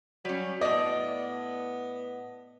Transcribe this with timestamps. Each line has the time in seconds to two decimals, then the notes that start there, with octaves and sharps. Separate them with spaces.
0.25 F#3 G3 C#4
0.61 A2 B3 D5 D#5